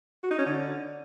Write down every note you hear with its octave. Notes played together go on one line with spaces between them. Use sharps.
F#4
D#4
C#4
D3